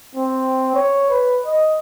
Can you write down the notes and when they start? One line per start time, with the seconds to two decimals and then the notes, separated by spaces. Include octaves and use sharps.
0.15 C4
0.75 C#5
1.10 B4
1.46 D#5